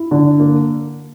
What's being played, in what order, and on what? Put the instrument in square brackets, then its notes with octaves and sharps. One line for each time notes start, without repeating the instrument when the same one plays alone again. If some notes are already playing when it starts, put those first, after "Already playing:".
Already playing: [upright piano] E4
D3
A#3